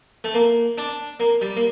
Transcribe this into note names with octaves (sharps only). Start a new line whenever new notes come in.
A3
A#3
D4
A#3
G3
A#3